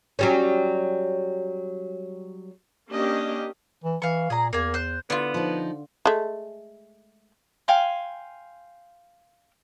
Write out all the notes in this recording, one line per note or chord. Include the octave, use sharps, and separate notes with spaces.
F#3 G3 C#4
A#3 C#4 D4 G4 D#5
E3
E3 F5 C#6
A#2 G#4 A#5
E2 A#3 G#5
C5 F#6
D3 B3 F4
F3 D#4
G#3 A3
F5 G5 G#5 C6